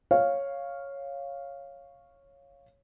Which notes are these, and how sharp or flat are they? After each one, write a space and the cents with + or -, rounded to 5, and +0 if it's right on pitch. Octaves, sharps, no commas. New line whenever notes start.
C#5 -5 F5 +0